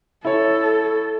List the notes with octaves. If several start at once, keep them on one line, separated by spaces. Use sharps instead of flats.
E4 A4 C#5